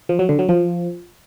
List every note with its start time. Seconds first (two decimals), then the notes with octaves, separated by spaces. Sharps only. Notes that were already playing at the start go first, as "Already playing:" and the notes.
0.09 F3
0.19 F#3
0.29 D3
0.39 F#3
0.49 F3